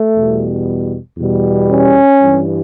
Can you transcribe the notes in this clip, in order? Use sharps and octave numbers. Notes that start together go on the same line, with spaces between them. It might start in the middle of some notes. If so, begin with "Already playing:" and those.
Already playing: A3
E2 B2 G3
E2 B2 G3
C#4
G2 E3 G3